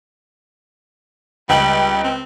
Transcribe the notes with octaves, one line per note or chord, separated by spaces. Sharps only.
C#2 G3 G5 F#7
C4